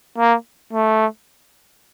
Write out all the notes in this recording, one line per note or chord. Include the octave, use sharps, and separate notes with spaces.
A#3
A3